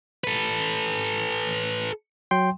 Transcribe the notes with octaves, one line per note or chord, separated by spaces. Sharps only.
A4 B4
F#3 G5 C6